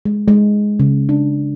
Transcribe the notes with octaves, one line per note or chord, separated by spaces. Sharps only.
G#3
G#3
C#3
D4